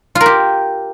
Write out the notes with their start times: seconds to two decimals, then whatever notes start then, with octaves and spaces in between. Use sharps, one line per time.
0.15 F4
0.21 A#4
0.26 G4